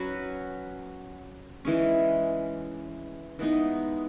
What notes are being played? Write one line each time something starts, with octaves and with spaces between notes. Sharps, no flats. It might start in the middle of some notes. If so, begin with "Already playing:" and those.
Already playing: F#3 C#4 F#4 B4
E3 G#3 C#4
E3 G#3 B3 D#4